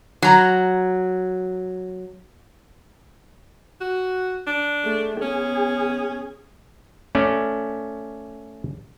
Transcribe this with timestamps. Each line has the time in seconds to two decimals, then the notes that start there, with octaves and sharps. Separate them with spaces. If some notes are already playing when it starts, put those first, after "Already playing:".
0.22 F#3 A#5
3.81 F#4
4.47 D4
4.84 A3 G#4
5.22 B3 C#4 G#4
7.15 A3 C#4 D5